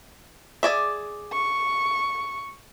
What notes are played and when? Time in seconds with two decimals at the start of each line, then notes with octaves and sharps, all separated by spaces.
0.63 G#4 D5 E5
1.32 C#6